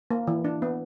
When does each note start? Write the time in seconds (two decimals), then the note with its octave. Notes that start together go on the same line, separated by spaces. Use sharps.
0.10 A#3
0.27 E3
0.45 D4
0.62 B3